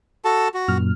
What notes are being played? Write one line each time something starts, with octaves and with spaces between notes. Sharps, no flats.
F#4 A4 A5
F#4
F#2 A#2 F6